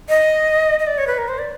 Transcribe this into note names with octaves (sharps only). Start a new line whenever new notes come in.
D#5
D#5
D5
C#5
B4
A#4
C5
D5